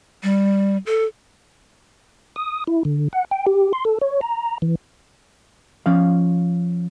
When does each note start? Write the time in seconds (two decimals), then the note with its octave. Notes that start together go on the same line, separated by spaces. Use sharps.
0.23 G3
0.86 A4
2.36 D#6
2.67 E4
2.85 D3
3.13 F#5
3.31 G5
3.47 G4
3.73 C6
3.85 A4
4.01 C#5
4.21 A#5
4.62 E3
5.86 F3 C#4 F5